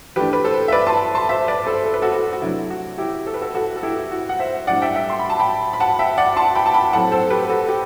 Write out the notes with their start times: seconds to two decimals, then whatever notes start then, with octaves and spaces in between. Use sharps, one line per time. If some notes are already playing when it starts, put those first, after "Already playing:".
0.16 E3 A3 D4 G4 B4
0.33 B4
0.44 A4 C5
0.68 E5
0.72 B4 D5
0.87 A5 C6
1.15 A5 C6
1.29 C5 E5
1.48 B4 D5
1.67 A4 C5
1.86 A4
1.94 B4
2.02 F#4 A4
2.14 F#4
2.33 F#4
2.42 C3 F#3 A3 D4 E4
2.70 F#4
2.98 E4 G4
3.27 A4
3.34 B4
3.41 F#4 A4
3.55 F#4 A4
3.76 A4
3.83 E4 G4
3.97 E4
4.11 F#4
4.29 F#5
4.39 C5 E5
4.67 A2 G3 D4 D5 F#5
4.82 E5 G5
4.95 E5 G5
5.10 C6
5.19 B5
5.30 A5
5.39 G5 B5
5.73 B5
5.80 F#5 A5
5.99 E5 G5
6.18 D5 F#5
6.36 A5 C6
6.55 G5 B5
6.66 A5
6.74 G5 B5
6.93 A2 F#3 A3 C4 F#5 A5
7.12 A4 C5
7.30 G4 B4
7.49 F#4 A4
7.69 G4